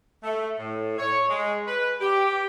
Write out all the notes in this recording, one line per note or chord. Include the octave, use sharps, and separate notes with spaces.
A3
A2
C#5
G#3
B4
G4